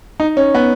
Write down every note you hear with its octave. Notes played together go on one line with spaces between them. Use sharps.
D#4
C#4
B3